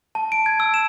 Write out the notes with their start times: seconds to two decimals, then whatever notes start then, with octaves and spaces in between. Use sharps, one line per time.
0.15 A5
0.32 D7
0.46 G#6
0.60 E6
0.74 E7